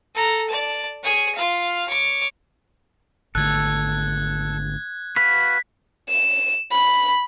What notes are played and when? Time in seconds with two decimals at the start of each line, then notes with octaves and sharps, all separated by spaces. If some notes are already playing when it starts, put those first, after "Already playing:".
0.15 A4 A#5
0.48 D5 A5
1.03 G#4 C#5
1.35 F4 F5
1.89 C#5 D6
3.35 G#1 D3 A3 A4 F#6 G#6
5.16 F#4 B4 F5 B6
6.10 E7
6.72 B5